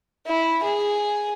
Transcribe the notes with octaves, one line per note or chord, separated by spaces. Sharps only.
E4
G#4